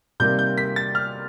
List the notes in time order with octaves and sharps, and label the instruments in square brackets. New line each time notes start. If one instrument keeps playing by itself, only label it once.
[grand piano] C3 D#3 G3 A#3 G6
G6
B6
A6
F6